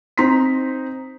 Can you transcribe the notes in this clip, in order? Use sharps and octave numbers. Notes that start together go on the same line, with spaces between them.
C4 D#4 A#5 C6 B6